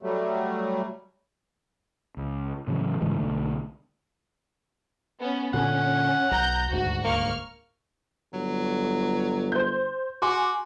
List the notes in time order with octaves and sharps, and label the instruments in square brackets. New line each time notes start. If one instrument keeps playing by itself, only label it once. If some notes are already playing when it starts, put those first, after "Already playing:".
[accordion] F#3 G3 A3
[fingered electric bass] C#2
A2 C#3 E3 F#3
G#2 C#3 E3 G#3
B1 D3 A3
[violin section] B3 C#4
[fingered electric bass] A#2 D3 [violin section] C#4 [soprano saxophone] F#5
[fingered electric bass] B1 [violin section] A#5 G6
[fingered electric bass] D#1 D2 G#2 [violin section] F#4
[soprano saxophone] A#3 [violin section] C#6 F6
[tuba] G1 [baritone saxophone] F#3
[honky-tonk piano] C5 G6
[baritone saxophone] F#4 [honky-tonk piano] G#5 C6 D6